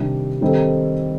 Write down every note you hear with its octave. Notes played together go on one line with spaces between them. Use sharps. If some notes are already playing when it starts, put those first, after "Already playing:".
Already playing: C3 D#3 G3 D4
D#3 G3 C4 D#4 A4